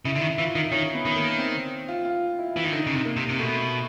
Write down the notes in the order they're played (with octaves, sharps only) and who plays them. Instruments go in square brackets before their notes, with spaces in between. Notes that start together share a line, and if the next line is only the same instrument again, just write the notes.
[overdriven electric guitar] C#3 [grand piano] E4
[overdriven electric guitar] D3
[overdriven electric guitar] D#3 [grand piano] E4
[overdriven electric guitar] E3 [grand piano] F4
[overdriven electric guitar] D#3 [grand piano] D#4
[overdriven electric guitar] D#3 [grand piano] C#4
[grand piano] B3
[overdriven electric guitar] D#3
[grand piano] A#3
C4
F4
F4
E4
[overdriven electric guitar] E3
D#3
[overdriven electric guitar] D3 [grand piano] D#4
[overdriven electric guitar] C#3
C3
[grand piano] A#3
[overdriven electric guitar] C3
C3
[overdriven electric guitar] B2 [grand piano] A3